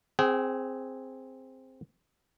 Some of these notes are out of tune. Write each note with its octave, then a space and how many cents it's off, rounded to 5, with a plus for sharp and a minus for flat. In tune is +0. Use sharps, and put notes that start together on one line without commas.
C4 +0 G#4 +0 G5 -40